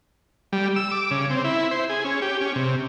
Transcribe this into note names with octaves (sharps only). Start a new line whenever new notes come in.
G3
E6
D6
C#3
C4
E4
C5
G#4
C#4
G4
C#4
C3